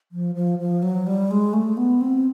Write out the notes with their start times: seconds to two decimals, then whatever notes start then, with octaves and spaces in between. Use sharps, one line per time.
0.12 F3
0.35 F3
0.59 F3
0.83 F#3
1.07 G3
1.31 G#3
1.53 A3
1.77 B3
2.01 C4